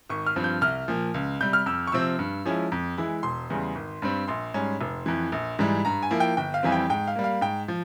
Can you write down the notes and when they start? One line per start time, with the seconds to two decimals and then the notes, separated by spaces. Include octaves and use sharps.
0.09 G#1 C#6
0.26 F6
0.36 G2 F3 C4
0.44 G6
0.61 C2 F6
0.88 A#2 F3
1.14 C#2
1.41 C3 G3 G6
1.53 F6
1.66 F2 E6
1.87 C#6
1.92 C3 F3 C4 E6
2.19 G2
2.46 F3 G#3 C#4 E4
2.72 F2
2.98 E3 G#3 E4
3.23 E1 C6
3.50 E2 C#3 G3
3.75 G#1
4.02 G2 G3 C4
4.28 A#1 C6
4.54 G#2 G3 C#4
4.81 F1
5.06 F2 E3
5.32 A#1
5.59 G#2 E3 G3
5.85 G2 A#5
6.03 G#5
6.11 F3 A#3 E4
6.20 G5
6.37 G1 G5
6.54 F5
6.63 F2 E3 G3 C4 G#5
6.72 G5
6.90 G#2 G5
7.07 F5
7.16 G3 A#3
7.24 F5
7.41 G#2 G5
7.68 F3